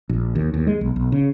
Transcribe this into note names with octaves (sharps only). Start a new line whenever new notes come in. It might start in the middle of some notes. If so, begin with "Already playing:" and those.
A#1
D#2
D#2
G#3
B1
B1
C#3